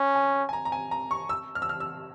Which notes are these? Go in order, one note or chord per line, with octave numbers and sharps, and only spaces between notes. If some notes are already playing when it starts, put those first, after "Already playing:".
Already playing: C#4
G#5
G#5
A#5
A#5
G#5
A#5
C#6
E6
F6
E6
F6
E6